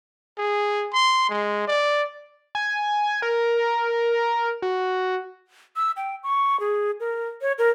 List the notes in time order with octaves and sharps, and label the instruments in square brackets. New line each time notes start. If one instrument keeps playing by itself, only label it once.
[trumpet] G#4
C6
G#3
D5
[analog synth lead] G#5
A#4
F#4
[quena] E6
G5
C#6
G#4
A#4
C#5
A#4